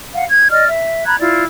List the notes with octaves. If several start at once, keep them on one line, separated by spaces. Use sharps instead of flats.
F5 F#5
G#6
D5 D#5 F6
E5
A#5 B5 F#6 G#6
E4 F4 D5